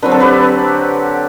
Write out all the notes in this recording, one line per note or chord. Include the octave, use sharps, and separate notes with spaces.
D3 F#3 C4 B4
A4
G4 B4